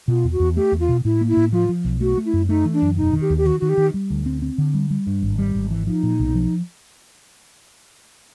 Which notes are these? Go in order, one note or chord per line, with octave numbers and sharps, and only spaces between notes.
B2 F4
E2
F#4
E2
A3 G4
E2
F4
B2
A2 E4
A#3
E4
A2
F3 F4
F3
B1
A3 F#4
A3
E4
F#2
A3 D#4
E3
D4
F#2
E1 D#4
D#3
G4
D#2
G4
D#3 F#4
D#3 F#4
G4
D#3
G3
D2
C4
C4
D3
G3
G3
G2
G#1
G3
G#1
E3
F3 D#4
A#2
B1
F3